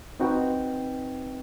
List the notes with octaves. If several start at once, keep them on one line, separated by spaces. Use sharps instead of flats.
C4 D#4 F#4 B4 G5